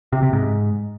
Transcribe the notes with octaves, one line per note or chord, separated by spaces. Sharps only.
C3
C3
G#2